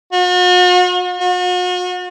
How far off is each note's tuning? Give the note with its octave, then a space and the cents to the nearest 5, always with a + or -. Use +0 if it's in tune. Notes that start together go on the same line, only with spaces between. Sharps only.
F#4 -45
F#4 -40